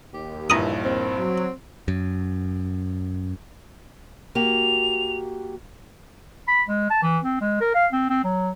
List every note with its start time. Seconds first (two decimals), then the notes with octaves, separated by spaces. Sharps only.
0.14 D#2 G4
0.50 A#1 G2 E3 E4 A#5 D#6
0.85 C4
1.18 F#3
1.88 F#2
4.35 A#3 F#4 G4 F7
6.48 B5
6.68 G#3
6.90 A5
7.03 E3
7.24 C4
7.41 G#3
7.61 A#4
7.75 F5
7.93 C4
8.10 C4
8.24 F#3